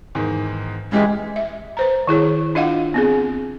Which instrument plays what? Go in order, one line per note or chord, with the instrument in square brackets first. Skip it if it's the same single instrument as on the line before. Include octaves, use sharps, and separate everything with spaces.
[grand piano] E2 G#2 D#3
[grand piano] C#3 E3 G4 [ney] G#3
[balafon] E5
B4 C5 A#5
D#3 E4 G#4 C#5
D4 F4 D#5 F5 F#5
B3 C4 G#4